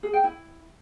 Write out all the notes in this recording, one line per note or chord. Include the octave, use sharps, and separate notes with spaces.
G#4
G5
E4